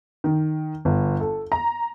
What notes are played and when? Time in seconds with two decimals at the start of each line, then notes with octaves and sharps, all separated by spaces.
0.24 D#3
0.85 G1
1.20 A4
1.52 A#5